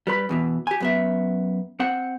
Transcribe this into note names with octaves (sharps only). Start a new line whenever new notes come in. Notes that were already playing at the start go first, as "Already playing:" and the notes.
G3 B4 B5
E2 B2 E3
G4 G#5
F#2 B3 E5
C4 F#5